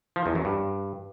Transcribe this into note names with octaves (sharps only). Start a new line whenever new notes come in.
F3
E2
F#2
G2